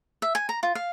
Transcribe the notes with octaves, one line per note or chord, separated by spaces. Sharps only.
E5
G#5
A#5
F4
F5